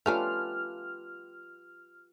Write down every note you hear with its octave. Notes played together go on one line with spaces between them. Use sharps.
A3 C#4 D4 F4 G4 B4 F6